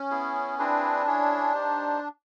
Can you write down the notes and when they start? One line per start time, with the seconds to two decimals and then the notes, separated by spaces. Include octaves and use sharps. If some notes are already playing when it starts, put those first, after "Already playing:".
Already playing: C#4
0.11 B3 E4 G#4
0.59 C4 D4 E4 G#4 B4
1.06 C#4 E4 G#4 C#5
1.53 D#4 G4 C5